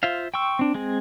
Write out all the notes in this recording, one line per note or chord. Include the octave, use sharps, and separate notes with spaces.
F4 C5 E5 F5
G5 C6 C#6 E6
C4 D4
G#3 C4 G#4